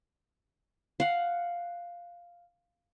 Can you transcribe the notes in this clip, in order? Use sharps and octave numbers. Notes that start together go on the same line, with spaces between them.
F5 F#5